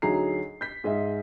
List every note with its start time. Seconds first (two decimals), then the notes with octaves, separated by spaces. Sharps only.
0.02 D2 F#3 D#4 G#4 A#5 C7
0.61 G6 B6
0.84 G#2 G#4 D#5 E5